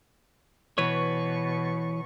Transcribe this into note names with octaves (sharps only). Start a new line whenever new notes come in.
B2 E3 B4 C#5 C#6